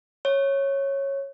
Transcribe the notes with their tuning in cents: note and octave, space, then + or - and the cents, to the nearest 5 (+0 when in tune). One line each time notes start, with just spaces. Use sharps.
C#5 -10